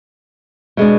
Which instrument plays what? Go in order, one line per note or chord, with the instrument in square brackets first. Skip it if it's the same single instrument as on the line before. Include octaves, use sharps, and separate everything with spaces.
[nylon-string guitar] B2 G#3 B3 D4